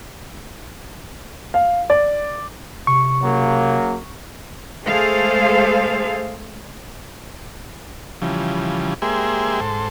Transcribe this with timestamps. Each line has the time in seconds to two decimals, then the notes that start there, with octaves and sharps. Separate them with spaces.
1.54 F5
1.90 D5
2.87 C3 C#6
3.23 C#3 F#3 A#3
4.87 G#3 A3 G#4 A4 C5 F5
8.22 C#3 E3 F3 G3
9.02 G#3 A#3 G4 G#4 C5 E5
9.60 G#2 A4 C5